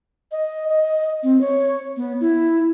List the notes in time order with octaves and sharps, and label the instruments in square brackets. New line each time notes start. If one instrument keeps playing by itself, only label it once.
[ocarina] D#5
D#5
C4
C#5
B3
E4